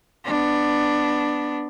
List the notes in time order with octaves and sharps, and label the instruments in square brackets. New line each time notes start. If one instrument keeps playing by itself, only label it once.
[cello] B3 D4